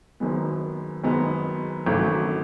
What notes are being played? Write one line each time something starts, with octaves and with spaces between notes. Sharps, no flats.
F#1 F#2 D#3 G#3 B3
F#1 F#2 D#3 G#3 B3
G#1 F#2 C#3 E3 A3